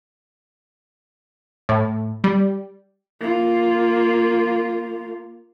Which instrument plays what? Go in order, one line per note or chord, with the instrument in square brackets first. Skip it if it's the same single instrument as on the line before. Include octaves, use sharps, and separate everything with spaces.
[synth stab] A2
G3
[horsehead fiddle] A#3 F4